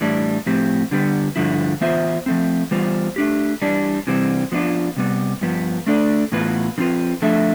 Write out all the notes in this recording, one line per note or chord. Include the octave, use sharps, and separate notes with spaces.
A2 E3 G3 D4
A2 F3 C4 G4
D3 G3 B3
G2 D3 F3 E4
E3 B3 F4 C5 E5
F3 A3 C4
E3 G3 B3 F4 C5
A3 D4 G4
E3 G3 D4
C3 E3 G3 C4
F3 B3 D4 F4
C3 G3 B3
G2 F3 B3
A3 D4 A4 D5
A2 E3 B3 F4 B4
D3 F3 C4 F4 B4
F3 A3 D4 A4 E5